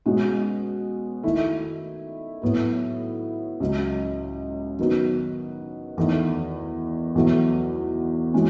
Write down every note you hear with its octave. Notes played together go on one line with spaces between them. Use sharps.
B2 G#3 C#4 F#4
D#3 A3 E4
A2 F#3 B3 F#4
C#2 C#3 F#3
D#3 F#3 B3 F#4
E2 D#3 A3
E2 B2 F#3 A3
E3 G#3 C#4 F#4